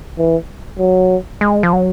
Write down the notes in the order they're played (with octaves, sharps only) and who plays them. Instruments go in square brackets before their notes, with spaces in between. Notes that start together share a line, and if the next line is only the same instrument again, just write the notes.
[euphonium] E3
F#3
[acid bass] G#3
F3
F#3